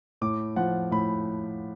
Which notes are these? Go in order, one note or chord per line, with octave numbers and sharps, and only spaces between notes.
A2 D6
F3 F#5
A2 B5